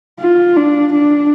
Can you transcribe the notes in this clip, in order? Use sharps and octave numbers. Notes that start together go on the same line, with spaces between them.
F4
D4
D4